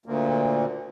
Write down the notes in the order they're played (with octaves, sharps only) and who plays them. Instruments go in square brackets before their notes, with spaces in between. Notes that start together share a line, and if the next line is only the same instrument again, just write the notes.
[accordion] D2 A#2